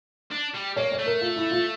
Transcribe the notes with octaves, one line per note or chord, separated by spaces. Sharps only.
D4
G3
A#3 C#5
C#5
A3
A#4
F4
E4
F4